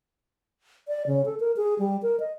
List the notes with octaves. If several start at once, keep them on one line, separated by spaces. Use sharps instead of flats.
D5
C#3
A4
A#4
G#4
G3
A#4
D#5